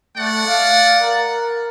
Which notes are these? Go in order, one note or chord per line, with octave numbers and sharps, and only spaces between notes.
A3 D5 F#5
F5
A#4